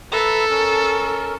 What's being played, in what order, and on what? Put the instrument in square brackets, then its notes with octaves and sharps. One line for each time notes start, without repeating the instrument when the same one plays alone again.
[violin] A4 [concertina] B4 E5 A#5
[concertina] C#4 A#4